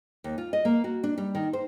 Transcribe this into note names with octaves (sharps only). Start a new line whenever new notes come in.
D#2
F4
D#5
A#3
F#4
D4
G3
D#3
C5